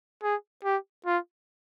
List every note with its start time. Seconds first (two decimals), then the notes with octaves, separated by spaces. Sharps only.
0.23 G#4
0.64 G4
1.06 F4